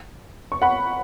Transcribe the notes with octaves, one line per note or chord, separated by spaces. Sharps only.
C#6
F#5 B5